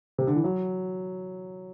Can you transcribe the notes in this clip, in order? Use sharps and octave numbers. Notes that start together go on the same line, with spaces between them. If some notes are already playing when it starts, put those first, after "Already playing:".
C3
D3
E3
F#3